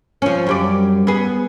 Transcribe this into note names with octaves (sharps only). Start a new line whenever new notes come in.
F3 C#4
F#2 G3 D5
B3 G#4